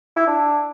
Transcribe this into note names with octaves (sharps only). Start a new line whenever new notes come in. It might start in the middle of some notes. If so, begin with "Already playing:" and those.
E4
D4